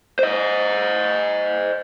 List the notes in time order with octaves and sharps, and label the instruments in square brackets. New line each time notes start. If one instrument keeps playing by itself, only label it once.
[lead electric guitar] C5 D#5